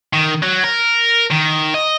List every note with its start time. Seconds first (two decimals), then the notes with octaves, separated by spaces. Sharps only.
0.13 D#3
0.43 F#3
0.64 A#4
1.31 D#3
1.74 D#5